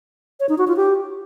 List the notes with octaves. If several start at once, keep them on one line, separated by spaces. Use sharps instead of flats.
C#5
D#4
F#4
F4
G4